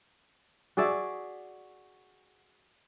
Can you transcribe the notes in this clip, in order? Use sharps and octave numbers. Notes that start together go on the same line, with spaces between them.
F#4 G#4 D5 E5